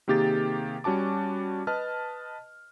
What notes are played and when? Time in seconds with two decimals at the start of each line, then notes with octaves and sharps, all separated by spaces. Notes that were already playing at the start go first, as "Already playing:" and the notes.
0.08 C3 D#3 A#3 G4 G#4 A6
0.84 G3 C#4 F#4 A5 D6
1.67 B4 D#5 A5 F6